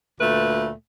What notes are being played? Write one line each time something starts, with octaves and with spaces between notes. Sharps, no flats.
D2 A#2 A3 B4